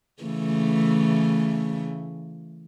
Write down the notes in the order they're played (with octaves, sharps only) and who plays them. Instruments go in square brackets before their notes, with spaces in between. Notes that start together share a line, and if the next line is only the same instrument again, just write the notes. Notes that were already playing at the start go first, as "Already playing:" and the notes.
[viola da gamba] C#3 E3 A3